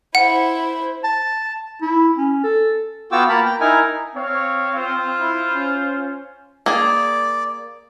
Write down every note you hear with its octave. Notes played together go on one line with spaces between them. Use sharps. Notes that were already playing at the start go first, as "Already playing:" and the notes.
E4 C5 F#5
A5
E4
C#4
A4
B3 F4 F#4 G5 D6 E6
A#3 A#4 A5 B5
G5
D#4 E4 A#4 G#5
C4 C#5 F5
F4 C5
E4
C#4
A#3 G#4 D5